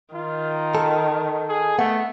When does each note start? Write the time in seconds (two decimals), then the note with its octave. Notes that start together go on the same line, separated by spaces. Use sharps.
0.14 D#3 F4
0.75 A4
1.49 G#4
1.79 A3 B3 F#5